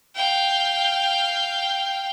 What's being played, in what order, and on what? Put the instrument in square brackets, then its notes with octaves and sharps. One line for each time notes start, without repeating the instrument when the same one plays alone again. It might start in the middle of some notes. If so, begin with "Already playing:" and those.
[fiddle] F5 G5